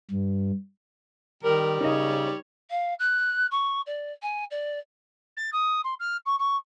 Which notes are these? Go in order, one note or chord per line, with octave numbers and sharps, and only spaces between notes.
G2
D#3 G3 A#4
C#3 D#4 C#5 D#5
F5
F#6
C#6
D5
G#5
D5
A6
D#6
C6
F6
C#6
C#6